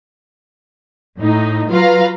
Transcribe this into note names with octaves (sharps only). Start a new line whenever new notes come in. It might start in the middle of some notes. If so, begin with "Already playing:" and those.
A2 D#4
F#3 F4 B4 F5 A#5